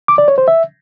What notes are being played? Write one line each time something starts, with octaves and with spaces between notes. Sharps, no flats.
D6
D5
C#5
C5
E5